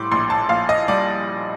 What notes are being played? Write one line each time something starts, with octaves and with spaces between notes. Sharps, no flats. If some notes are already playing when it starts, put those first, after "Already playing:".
Already playing: A2 G3 C6 D6
A#1 C6
A5
A#1 F5
D#5
G3 D5